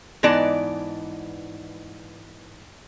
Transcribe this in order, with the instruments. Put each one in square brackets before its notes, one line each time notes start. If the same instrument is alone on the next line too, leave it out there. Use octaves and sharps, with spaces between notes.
[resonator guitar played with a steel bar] G#2 E3 B3 D#4 D5 A5